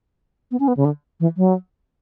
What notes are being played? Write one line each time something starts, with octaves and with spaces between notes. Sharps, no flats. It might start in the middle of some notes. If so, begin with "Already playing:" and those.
B3
C#4
B3
C#3
D3
E3
F#3